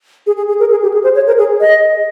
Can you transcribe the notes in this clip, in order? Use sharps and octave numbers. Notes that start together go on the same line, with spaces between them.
G#4
G#4
G#4
A#4
G#4
G4
G#4
C5
C#5
A#4
G#4
D#5